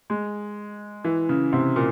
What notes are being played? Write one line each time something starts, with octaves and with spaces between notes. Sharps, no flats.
G#3
E3
C#3
C3
A#2